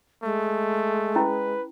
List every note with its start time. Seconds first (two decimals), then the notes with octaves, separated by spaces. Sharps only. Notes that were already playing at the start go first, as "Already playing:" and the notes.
0.23 G#3 A3
1.16 C#4 E4 B4